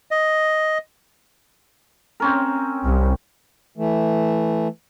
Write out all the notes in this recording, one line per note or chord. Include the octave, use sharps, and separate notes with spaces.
D#5
C4 C#4 A#4
C2
E3 A3